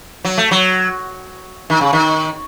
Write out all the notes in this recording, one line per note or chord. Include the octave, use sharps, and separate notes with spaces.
F#3
A3
F#3
D#3
C#3
D#3